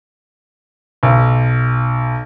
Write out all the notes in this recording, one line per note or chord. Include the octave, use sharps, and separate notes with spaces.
B1